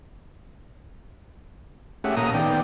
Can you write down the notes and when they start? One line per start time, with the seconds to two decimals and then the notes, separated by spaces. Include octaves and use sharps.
2.04 A3 C#4 G4 G#4 E5 F#5
2.17 A#2 A#3 C#4 A4 A#5 D#6
2.34 D#3 B3 D5 G5